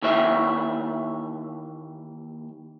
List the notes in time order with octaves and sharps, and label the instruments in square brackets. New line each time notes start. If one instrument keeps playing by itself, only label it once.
[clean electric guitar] D#2 E3 C#5 E5